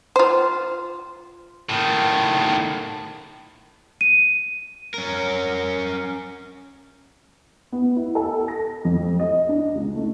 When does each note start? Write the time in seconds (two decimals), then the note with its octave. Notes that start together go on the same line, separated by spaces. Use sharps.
0.16 F4 C5
1.69 A2 D#3
4.01 D#7
4.94 C#4 A#4
7.72 B3
7.97 E4
8.15 A4
8.48 A#6
8.85 F2
9.19 D#5
9.49 D4
9.75 C#2
9.96 A3